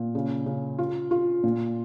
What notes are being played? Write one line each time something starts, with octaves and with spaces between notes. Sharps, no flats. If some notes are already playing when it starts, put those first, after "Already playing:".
Already playing: A#2
C#3
C#3
F4
F4
A#2